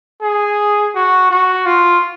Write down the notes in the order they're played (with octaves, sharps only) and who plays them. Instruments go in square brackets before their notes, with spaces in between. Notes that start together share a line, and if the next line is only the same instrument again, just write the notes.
[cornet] G#4
F#4
F#4
F4